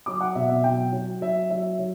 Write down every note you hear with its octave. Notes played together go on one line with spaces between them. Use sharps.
F#3 D6
F#5
B2 E5
E5
F#3 G5
F#3
F#3 E5
F#3 E5
F#3